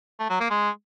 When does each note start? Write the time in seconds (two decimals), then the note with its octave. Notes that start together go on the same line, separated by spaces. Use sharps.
0.20 A3
0.30 F#3
0.40 A#3
0.51 G#3